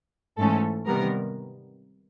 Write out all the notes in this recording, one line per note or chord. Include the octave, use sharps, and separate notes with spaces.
G#2 E3 A3 C#4 A4
C3 D#3 G3 B3 A#4